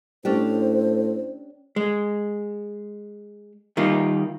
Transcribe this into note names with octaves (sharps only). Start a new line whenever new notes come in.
A2 C#4 D4 G4 C5
G#3
D#3 G3 A#3 F4